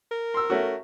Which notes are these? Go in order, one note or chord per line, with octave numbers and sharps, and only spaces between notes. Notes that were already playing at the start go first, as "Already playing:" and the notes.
A#4
C6 E6
A3 C#4 F#4